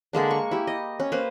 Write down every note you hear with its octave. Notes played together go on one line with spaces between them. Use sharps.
D3 G#3 A#3 D4
C#6
E4 G4
D#5
C#4
A#3 B4 C5